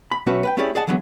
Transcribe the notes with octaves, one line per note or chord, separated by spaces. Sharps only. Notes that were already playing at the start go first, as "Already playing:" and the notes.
B5
B1 A3 C#4 F#4 B4 E5
B4 F#5 G5
A3 C#4 E4 G4 G#4 D5
G#4 D5 D#5 F#5 A5
D3 E3 F#3 G#3 A#3 B3